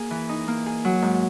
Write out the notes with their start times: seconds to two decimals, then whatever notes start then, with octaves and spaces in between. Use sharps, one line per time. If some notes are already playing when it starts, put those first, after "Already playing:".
Already playing: A#3 G#4
0.11 E3
0.29 D#4
0.48 A#3
0.66 G#4
0.85 F#3
1.02 G#2